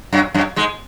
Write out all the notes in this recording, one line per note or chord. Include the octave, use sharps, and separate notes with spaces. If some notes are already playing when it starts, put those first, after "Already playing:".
F#2 F#3
F#2 F#3
G#2 G#3